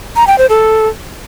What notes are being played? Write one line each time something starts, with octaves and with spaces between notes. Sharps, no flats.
A#5
G5
C5
A4